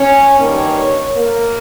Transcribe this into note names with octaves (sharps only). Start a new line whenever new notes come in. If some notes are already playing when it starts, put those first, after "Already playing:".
Already playing: C#4 C#5
G2 D#3 A#3 C#4
A#3 A#4